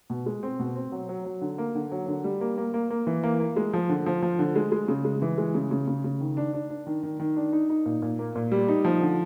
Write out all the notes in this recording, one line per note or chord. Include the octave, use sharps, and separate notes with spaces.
B2
G#3
C4
B2
C4
F#3
F#3
F#3
D3
A#3
D3
F#3
D3
G3
A#3
A#3
A#3
A#3
E3
A#3
A#3
G#3
F3
D3
F3
F3
D3
G#3
G#3
C#3
G#3
E3
G#3
C#3
C#3
C#3
C#3
D#3
D4
D4
D4
D#3
D#3
D#3
D4
D#4
D#4
A#2
A#2
A#3
A#2
G3
D#4
F3
D3